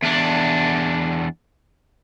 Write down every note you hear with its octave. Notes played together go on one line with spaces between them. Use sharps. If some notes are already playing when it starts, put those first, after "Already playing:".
E2 D4